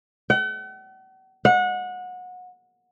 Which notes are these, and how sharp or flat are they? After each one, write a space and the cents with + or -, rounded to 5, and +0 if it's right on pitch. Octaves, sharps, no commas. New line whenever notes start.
F#5 +45
F#5 -25